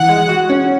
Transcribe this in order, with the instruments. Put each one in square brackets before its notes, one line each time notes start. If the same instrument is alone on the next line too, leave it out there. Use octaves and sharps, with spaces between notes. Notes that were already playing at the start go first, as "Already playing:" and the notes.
Already playing: [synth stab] E3 [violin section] F#5
[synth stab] G#3
F#4
C#4